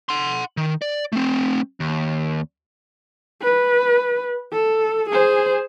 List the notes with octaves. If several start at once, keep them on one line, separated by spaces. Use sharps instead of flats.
F#5 C6
D#3
D5
A3 C4
D#2
B4
A4
G#4 C5